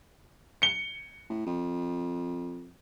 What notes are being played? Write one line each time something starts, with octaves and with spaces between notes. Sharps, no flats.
C#7 G7
A2
F2